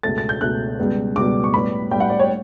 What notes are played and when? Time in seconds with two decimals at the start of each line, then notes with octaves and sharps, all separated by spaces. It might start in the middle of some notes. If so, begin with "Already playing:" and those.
0.03 C#2 B2 A3 A6
0.18 A6
0.29 G6
0.41 C#2 B2 A3 F#6
0.79 C#2 B2 G3 B3
1.16 C#2 B2 G3 B3 D6
1.44 C#6
1.54 A2 G3 B3 B5
1.91 A2 G3 B3 G5
2.00 F#5
2.10 D5
2.20 C#5